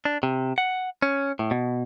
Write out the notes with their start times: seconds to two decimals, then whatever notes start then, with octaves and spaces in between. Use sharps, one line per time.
0.05 D4
0.23 C3
0.58 F#5
1.02 C#4
1.39 A2
1.51 B2